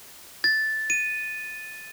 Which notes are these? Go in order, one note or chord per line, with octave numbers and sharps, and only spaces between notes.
A6
D#7